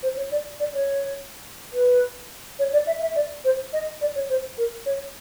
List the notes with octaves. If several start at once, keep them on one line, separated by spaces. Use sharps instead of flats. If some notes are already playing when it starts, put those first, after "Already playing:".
C5
C#5
D5
D5
C#5
B4
C#5
D5
E5
E5
D5
C5
D#5
D5
C#5
C5
A#4
C#5